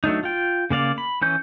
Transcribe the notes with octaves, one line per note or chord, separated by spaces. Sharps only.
F#3 A3 D4 D#4
F4 G5
C#3 A#3 D5 F5
B5
E3 C#4 G6